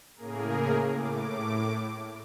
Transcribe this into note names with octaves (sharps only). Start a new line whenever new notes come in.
A2 C#3 A#3 G#4 A#4
A2 D6